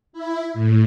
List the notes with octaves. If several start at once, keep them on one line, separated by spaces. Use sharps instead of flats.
E4
A2